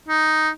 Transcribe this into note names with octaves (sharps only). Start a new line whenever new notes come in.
D#4